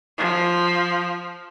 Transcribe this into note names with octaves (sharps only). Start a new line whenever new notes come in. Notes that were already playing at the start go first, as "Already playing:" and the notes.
F3